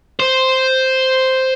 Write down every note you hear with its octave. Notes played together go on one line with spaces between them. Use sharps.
C5